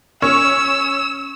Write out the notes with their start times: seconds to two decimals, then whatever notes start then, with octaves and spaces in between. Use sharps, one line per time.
0.22 C#4 E6